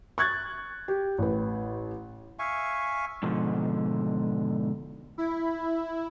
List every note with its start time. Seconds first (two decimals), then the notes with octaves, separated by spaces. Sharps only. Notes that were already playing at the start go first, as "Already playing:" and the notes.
0.18 C#6 F#6 G#6 A6
0.88 G4
1.18 A1 B4
2.39 E5 F5 G#5 C#6
3.23 G#2 B2 D3 F3
5.18 E4